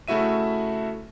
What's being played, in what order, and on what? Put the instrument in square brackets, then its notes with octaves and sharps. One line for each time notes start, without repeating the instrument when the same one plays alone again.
[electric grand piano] C#3 A3 E4 F#4 E5 D#7